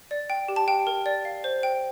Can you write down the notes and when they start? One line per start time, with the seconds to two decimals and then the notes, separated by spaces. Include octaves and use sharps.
0.11 D5
0.30 G5
0.48 G4
0.56 A5
0.68 G4 G5
0.87 A#4
1.06 D5
1.25 F5
1.44 C5
1.63 G5